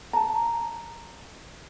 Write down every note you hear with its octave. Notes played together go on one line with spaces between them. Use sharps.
A5 A#5